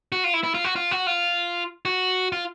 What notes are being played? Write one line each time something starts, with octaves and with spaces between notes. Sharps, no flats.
F#4
F4
E4
E4
F4
F#4
F4
F#4
F4
F#4
F4